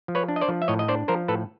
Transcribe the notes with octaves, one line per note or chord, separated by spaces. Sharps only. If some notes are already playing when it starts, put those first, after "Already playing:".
F3
B4 C#5
D4
D#5
C5 D5
F3
E5
A2 C#5 D#5
D#5
D4 C5 D5
F3 A#4 C5
A2 A4 B4